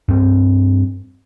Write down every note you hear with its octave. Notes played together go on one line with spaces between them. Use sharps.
G2 C4